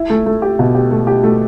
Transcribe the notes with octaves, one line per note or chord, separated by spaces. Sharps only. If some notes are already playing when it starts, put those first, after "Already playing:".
Already playing: E4
A3
A3
G4
B2
G4
A3
G4
A3